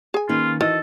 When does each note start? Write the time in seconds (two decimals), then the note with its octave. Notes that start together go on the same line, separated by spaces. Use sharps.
0.14 G#4 G#5
0.29 D#3 A#3 C#4 F4 B4
0.61 D#3 E3 F#4 A4 C5 D#5